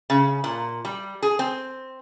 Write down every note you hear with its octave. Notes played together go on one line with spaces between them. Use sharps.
C#3
A#2
G3
G#4
C4